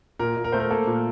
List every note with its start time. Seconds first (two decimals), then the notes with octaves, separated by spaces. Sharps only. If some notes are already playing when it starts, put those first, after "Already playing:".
0.19 A#2 A#4
0.36 A#2
0.44 A#4
0.52 A3 C5
0.60 A#4
0.70 A#3 A4
0.87 A#2